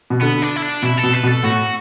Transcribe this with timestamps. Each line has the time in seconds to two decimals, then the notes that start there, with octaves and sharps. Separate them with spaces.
0.10 B2
0.22 D3 B3
0.42 D4
0.56 E4
0.63 D4
0.83 B2 E4
0.98 A4
1.04 B2
1.14 B4
1.23 B2
1.28 A4
1.43 A2 F#4